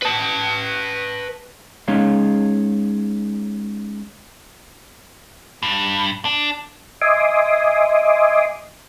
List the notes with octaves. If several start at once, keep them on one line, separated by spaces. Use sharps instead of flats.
B4 A5
G#3 C#4 D#4 G#4 C#5 F5
G2
D4
D#5 E5 G#5 C6 D6 D#6